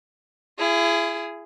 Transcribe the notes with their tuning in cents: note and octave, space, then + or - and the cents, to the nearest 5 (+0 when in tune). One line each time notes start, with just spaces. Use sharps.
E4 +40 G#4 +0